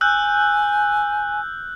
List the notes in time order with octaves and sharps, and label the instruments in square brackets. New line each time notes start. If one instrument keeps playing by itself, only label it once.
[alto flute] G#5 [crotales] E6 F#6 G6